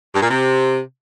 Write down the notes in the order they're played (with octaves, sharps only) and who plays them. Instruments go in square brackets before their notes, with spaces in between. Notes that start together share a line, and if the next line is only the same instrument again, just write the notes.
[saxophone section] G2
A#2
C3